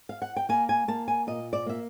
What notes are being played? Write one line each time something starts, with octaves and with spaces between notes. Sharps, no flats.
F5
F#5
G5
A#3 G#5
G#5
A#3 A5
G#5
A#2 D#5
D5
A#3 E5